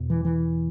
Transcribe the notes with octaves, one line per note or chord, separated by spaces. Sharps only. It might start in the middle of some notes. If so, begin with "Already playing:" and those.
Already playing: E2 B2
E3
E3